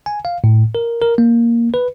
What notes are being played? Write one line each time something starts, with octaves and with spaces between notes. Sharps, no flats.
G#5
F5
A2
A#4
A#4
A#3
B4